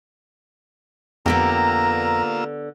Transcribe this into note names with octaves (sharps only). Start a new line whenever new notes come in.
F2 D3 A#3 B3 F4 G4 A#5 E6